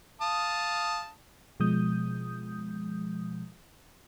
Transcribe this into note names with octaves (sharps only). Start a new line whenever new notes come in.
F5 A5 D#6
B2 F3 G#3 D#6 G6